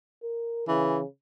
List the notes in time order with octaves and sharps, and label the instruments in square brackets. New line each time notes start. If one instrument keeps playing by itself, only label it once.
[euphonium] A#4
[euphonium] C#3 [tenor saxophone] E3